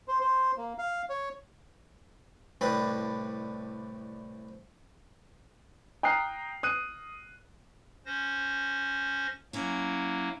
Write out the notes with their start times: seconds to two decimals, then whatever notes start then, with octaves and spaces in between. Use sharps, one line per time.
0.08 C5
0.21 C5
0.58 A#3
0.78 F5
1.09 C#5
2.61 C2 A2 D4 G4 B4
6.03 G5 A#5 D#6 F6 F#6 C7
6.63 D#6 F#6 D#7
8.06 C#4 C5 A#6
9.53 F#3 A#3 C#4 E4